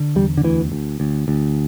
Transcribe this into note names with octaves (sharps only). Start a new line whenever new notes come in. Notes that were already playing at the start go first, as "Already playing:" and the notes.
Already playing: D3
E2 G3
D3
D2 E3
D2
D2
D2